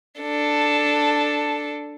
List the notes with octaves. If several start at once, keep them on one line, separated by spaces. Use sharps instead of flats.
D4 A4